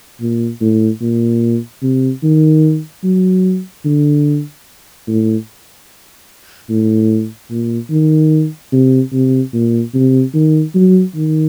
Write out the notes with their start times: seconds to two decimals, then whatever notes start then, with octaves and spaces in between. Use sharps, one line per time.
0.21 A#2
0.61 A2
1.01 A#2
1.83 C3
2.23 D#3
3.04 F#3
3.85 D3
5.08 A2
6.70 A2
7.50 A#2
7.90 D#3
8.73 C3
9.13 C3
9.53 A#2
9.94 C3
10.34 D#3
10.75 F#3
11.15 D#3